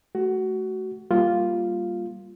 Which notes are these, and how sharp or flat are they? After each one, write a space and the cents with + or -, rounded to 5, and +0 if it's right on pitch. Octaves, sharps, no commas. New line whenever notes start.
A3 -20 F#4 +20
G3 +0 A#3 +0 F4 +0